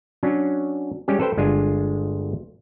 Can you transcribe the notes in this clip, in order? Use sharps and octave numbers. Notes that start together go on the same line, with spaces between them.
F#3 C#4 D4
G3 G#3 C#4 G4
A4 B4 C5 G5
G1 G#3 D4 F4 G#5